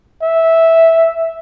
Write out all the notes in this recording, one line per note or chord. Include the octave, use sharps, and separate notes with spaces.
E5